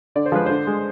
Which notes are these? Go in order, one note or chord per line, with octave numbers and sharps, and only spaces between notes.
D3 D5
C5
F3 G#3 B4
D3 C5
G#3